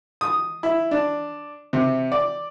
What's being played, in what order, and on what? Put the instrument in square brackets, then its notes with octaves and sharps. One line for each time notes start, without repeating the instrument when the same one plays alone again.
[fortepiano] D#6
E4
D4
C3
D5